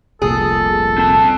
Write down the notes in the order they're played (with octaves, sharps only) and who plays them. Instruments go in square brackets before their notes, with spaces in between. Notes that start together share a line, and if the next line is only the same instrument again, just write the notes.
[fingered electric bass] F1 C2 A#2 [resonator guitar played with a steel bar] G#4 [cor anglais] A4
[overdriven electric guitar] C4 A5